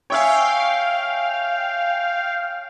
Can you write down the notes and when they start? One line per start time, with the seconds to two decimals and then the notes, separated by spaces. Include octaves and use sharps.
0.10 C#5 E5 F5 G5 G#5